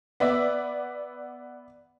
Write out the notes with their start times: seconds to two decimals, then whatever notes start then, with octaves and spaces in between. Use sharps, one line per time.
0.20 B3 D5 E5